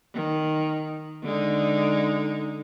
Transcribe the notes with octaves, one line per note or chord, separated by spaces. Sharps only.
D#3
D3 G#3 D#4